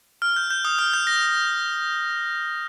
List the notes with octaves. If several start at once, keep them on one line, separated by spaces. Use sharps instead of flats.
F6
G6
G6
D#6
F6
G6
A#6